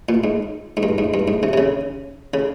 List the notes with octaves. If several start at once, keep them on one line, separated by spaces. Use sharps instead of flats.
A#2
G#2
G#2
G2
G#2
G2
G#2
C3
C3
C#3
C#3